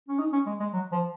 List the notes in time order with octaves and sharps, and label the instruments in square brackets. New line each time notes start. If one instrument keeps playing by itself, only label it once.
[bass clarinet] C#4
D#4
C#4
G#3
G#3
F#3
F3